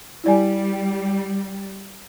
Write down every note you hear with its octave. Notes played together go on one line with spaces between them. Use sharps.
G3 E4 D5 G#5